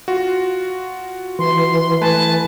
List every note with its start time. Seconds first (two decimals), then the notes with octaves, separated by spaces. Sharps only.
0.08 F4 F#4
1.39 E3 C6
2.01 A3 B4 G#5 A5